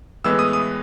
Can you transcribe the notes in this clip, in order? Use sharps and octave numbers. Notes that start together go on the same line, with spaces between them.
A2 E3 G#3 B3 E6
D#6
D#6